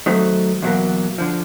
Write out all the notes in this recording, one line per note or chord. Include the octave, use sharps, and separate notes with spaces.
D#3 F#3 A3 C4
E2 B2 F#3 A#3
D3 F3